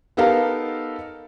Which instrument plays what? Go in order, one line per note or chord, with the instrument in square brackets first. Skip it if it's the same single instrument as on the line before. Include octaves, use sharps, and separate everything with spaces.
[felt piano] B3 D#4 G4 A4 A#4 F5